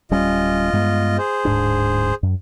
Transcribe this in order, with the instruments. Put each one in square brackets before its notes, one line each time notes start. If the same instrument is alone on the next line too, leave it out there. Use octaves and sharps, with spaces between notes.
[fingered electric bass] D1 G3 C#4 [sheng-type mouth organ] F4 D#5
[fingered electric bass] G2 G#3 B3
[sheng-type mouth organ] G#4 C5
[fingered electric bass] D1 G#2 D4
F#2